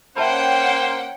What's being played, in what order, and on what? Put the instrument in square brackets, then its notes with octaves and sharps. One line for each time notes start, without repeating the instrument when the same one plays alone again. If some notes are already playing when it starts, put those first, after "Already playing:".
[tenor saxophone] A#3 [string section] C#4 F#5 G5 [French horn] C5 [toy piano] E5 A5 B5